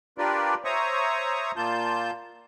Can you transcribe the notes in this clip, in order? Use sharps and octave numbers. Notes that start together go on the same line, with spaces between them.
D4 F4 G4 A#4 B4 D5
C5 C#5 E5 A#5 C#6 D#6
A#2 A#3 F4 A5 G6